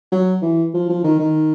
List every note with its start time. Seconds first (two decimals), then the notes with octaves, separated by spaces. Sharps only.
0.12 F#3
0.42 E3
0.74 F3
0.89 F3
1.04 D#3
1.19 D#3